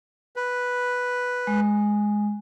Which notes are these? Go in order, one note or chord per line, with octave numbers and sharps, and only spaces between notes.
B4
G#3